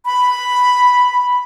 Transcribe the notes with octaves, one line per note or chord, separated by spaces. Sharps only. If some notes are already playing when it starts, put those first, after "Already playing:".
B5